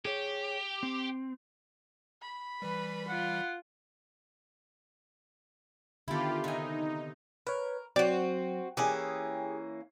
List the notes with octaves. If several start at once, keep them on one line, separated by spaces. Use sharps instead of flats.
G4 G#4 C#5
C4
B5
E3 G3 B4
F4 F#5
D3 D#3 B3 E4 F4 G4 A4
C3 D#4 G#5
A#4 B4 C#5
F#3 C4 F#4 D5
E3 A#3 C#4 G4 G#4